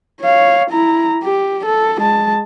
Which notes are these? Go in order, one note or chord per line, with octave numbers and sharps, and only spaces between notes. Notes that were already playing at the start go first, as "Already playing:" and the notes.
C#5 F5
E4 A#5
G4
A4
G#3 A5